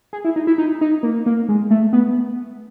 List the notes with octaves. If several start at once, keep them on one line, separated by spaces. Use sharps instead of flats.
G#4
E4
D#4
E4
D#4
D#4
A#3
A#3
G#3
A3
B3